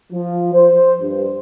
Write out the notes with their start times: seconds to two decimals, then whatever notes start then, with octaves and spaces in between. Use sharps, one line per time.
0.12 F3
0.53 C5
1.01 G2